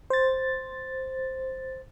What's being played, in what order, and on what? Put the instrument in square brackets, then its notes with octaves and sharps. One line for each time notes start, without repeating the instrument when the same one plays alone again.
[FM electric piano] C5 A6